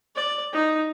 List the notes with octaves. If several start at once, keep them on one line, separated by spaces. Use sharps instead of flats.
D5
D#4